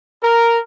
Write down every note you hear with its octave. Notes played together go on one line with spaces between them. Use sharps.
A#4